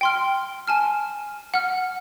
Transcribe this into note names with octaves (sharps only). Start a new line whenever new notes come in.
G5 C6 F6
G#5 A5 F6
F#5 F6